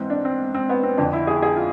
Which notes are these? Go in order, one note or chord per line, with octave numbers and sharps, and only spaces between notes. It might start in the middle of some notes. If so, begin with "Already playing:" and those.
Already playing: G#2 E3 C4
D4
C4
C4
B3
C4
F2 D3 D4
E4
G#4
G#4
F4